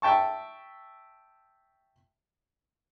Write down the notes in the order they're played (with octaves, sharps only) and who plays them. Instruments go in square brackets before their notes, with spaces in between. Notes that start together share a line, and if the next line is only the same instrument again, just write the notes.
[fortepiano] E5 G5 A5 C#6